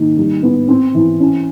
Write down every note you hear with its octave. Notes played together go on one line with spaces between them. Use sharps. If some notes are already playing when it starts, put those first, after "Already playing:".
Already playing: D#3 A#3
G3
B3
C4
E3
C#4